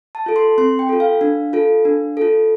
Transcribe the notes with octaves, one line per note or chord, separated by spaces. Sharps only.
A5
F4 A4
C6
C4 C6
G5
F4 A4
F5
D4
F4 A4
D4
F4 A4